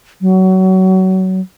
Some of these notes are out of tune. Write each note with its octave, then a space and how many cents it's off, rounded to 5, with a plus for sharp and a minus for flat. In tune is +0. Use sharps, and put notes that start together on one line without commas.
F#3 +25